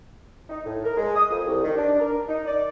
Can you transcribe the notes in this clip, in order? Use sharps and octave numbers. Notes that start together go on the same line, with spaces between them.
D#4
A2
A#4
G#3
D#6
F2
C2
D#3
D4
A#4
D#4
D5